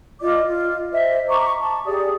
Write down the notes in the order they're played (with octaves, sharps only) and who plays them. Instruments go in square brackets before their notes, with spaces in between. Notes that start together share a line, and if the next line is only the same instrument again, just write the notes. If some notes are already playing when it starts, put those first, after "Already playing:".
[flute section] F4 D5 D#5 D6
F4
C5 D#5 E5
A#5 C#6 D6
A5
G4 G#4 D5 D#6